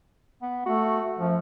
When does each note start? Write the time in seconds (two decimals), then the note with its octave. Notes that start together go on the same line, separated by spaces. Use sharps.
0.42 B3
0.66 A3 F#4
1.19 F#2 F3